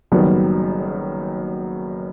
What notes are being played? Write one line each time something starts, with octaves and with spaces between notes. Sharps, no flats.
F#1 F#2 D#3 G3 B3